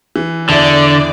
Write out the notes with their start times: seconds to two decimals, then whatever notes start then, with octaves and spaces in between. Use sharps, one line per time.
0.16 E3
0.49 E2 D3 E4 D5